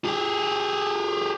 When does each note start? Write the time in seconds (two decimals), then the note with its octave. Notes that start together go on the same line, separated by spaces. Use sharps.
0.05 G4 G#4